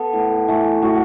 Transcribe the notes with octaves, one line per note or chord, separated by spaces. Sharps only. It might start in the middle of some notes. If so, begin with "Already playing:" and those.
Already playing: B3 A4 B4
A2
E3 A3
A2 F#4